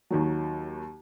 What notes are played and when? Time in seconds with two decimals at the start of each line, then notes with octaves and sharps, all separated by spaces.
0.11 D#2 D#3 F#3